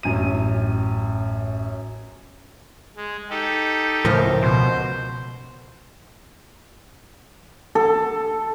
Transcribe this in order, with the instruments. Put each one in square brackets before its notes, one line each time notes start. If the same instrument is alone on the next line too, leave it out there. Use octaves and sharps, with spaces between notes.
[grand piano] A1 F#2 D#7
[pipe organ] G#3
D#4 G4 A4
[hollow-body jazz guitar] C#2 F3 A#4 [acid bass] A2
[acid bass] B2 [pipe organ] C5
[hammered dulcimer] A4